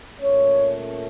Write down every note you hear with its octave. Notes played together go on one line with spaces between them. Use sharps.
A#2 A3 C#4 C#5